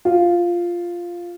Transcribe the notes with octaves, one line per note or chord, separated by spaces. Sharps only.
F4